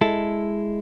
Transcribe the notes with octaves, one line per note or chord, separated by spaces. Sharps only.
G#3 E4 A4